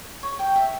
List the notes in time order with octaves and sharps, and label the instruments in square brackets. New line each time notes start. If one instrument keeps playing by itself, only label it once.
[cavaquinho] C#5
G5
E5